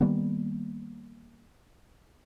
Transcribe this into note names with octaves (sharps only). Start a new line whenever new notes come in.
D#3 G3 A#3 B3